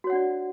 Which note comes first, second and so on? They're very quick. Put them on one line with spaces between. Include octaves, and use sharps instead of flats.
F#4 C#5 F#5 D4 D5